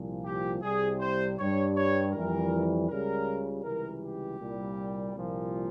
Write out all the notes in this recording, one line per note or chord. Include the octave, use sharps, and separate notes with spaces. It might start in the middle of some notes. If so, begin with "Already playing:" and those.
Already playing: C2 A#2 F3
G4
C2 C3 G3 G#4
C5
G2 G3 C#5
C#5
F2 E3 G3 A#4
C#2 C#3 G3 A#4
C#2 C3 E3 G3 A#4
G4
C2 A#2 G3
C2 A#2 F3